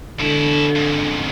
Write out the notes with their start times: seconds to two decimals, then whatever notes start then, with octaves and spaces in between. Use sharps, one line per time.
0.20 B2 D3 E4
0.76 F2 G#2